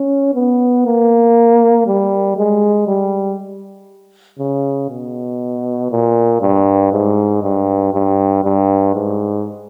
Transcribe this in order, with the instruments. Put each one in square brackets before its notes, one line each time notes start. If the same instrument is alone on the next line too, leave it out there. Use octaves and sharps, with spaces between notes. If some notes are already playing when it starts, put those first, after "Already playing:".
Already playing: [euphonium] C#4
B3
A#3
G3
G#3
G3
C#3
B2
A#2
G2
G#2
G2
G2
G2
G#2